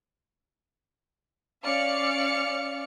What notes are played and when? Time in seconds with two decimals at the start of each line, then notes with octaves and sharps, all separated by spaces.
1.64 C#4 D5 F5 F6 C#7